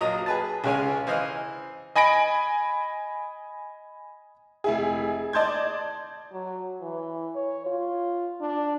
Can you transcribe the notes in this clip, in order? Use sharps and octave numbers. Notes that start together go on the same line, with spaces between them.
A#1 F#3 D#5 A#5 D#6
G#4 B4 A5
C#2 C#3 G#3 C#5 F5 G#5
E3 C5 D#5 F5 F6
D#5 G#5 B5 A#6 D7
F1 E4 G#4
D5 D#5 A5 C6 G6 G#6
F#3
E3
C#5
F4
D4